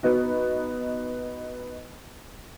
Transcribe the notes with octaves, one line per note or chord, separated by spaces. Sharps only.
B3 D#4 F#4